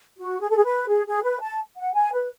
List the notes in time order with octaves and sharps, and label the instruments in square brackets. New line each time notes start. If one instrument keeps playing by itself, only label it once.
[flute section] F#4
G#4
A4
G#4
B4
G#4
G#4
B4
A5
F#5
G#5
B4